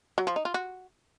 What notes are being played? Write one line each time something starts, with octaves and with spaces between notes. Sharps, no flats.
F#3
F3
D#4
F4
F#4